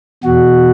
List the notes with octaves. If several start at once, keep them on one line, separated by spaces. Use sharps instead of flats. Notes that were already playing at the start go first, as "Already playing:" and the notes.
E2 B2 F#4